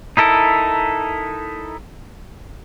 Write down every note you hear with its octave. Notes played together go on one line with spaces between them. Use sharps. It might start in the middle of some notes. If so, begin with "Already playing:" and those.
D#4 E4 A4 A#4